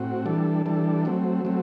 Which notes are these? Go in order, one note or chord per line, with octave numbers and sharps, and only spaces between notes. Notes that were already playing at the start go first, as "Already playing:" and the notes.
Already playing: A2 C4 F#4
E3 G3 D4 A4
E3 G3 D4 A4
F#3 A3 C4
F#3 A3 C4